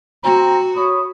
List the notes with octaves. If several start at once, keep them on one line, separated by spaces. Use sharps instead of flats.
C4 F#4 A#5
C#5 B5 D#6